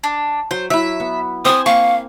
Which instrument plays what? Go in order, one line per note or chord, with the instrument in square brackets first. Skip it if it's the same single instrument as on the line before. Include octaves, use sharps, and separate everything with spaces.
[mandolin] D4
[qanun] F#3 [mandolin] C5
[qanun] F#3 E4 [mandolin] E5
[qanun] B3
[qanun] C4 G#5 [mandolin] C5 [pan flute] D#6
[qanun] A#3 [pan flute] F5 [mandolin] C#6